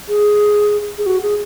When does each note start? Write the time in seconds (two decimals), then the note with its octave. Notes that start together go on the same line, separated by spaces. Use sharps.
0.09 G#4
0.98 G#4
1.06 F#4
1.23 G#4